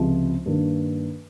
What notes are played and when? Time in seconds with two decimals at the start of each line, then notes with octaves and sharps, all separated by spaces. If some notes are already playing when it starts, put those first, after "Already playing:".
Already playing: C#2 C3 F3
0.46 G2 D#3 A#3